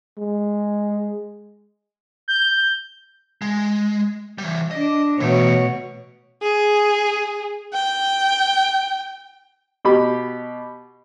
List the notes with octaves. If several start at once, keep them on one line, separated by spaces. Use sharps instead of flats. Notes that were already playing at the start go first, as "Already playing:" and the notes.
G#3
G6
G#3
E3 G3
D4 D#5
B2 E3 A3 C#5
G#4
G5
B2 G4 B5